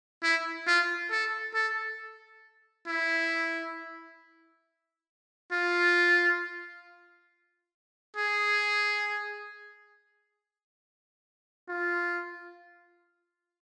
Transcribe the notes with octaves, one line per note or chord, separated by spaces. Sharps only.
E4
F4
A4
A4
E4
F4
G#4
F4